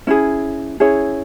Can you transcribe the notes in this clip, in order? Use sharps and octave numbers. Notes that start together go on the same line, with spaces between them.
C#4 E4 G#4
C#4 E4 G#4 C#5